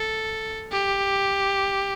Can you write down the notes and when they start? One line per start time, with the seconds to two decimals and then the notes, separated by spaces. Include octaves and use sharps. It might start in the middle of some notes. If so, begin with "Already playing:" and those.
Already playing: A4
0.71 G4